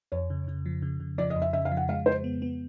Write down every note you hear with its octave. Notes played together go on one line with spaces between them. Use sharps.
F2 C#5
C#3
C#3
F3
C#3
C#3
F3 D5
D#5
F2
E5
C#3 E5
F5
F3
F#5
G#3 F5
G#3 C5
B3
B3